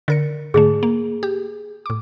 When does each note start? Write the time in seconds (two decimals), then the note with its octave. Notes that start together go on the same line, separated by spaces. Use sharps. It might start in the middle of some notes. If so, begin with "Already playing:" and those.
0.08 D3 A#4 C#7
0.54 G#2 D3 A3 G#4
0.83 A#3
1.23 G4
1.86 A2 D6